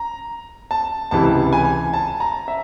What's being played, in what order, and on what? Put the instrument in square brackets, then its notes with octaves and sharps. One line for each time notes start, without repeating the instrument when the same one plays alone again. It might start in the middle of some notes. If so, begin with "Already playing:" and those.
Already playing: [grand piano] A#5
A5
C#2 C3 E3 A5
G#5
A5
A#5
E5